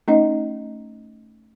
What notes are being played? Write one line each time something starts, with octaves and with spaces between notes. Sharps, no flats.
A3 C#4 D#4 D#5